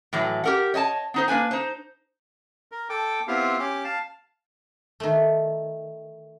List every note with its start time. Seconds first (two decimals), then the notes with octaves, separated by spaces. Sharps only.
0.13 A2 E3 F#3
0.44 G4 A#4 F#5
0.74 C#5 D#5 G#5 A5
1.14 B3 D#4 C5
1.28 A#3 D4 B4 G#5
1.51 D#4 C5
2.72 A#4
2.89 A4 G5 D6
3.28 B3 C4 E4 F4 G4 F5
3.59 C#4 G4 D6
3.84 F5 A5
5.00 D#3 A3